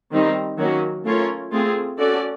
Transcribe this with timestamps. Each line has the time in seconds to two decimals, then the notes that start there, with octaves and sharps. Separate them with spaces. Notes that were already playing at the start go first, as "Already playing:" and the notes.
0.12 D#3 G3 C4 D#4
0.58 D#3 F#3 A#3 C#4 F#4
1.05 A3 C#4 F4 A#4 C#5
1.52 A3 C4 F4 G#4
1.99 C#4 F#4 A4 D5